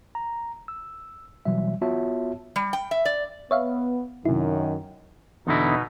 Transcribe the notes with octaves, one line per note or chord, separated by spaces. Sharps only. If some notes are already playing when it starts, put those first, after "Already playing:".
A#5
E6
B2 E3 F#3 G3 E5
B3 F4 F#4 C#5 E5 A5
G3
G5
E5
D5
B3 C#5 E5 F5
F#2 C3 D#3 E4
E2 B2 D3 D#4 E4